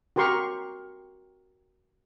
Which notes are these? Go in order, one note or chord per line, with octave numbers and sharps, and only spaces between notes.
F#4 G4 A#4 C6 C#6